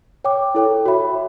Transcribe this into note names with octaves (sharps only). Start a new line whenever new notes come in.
C#5 G5 D6
E4 A4 C#5 G5
F#4 C#5 E5 B5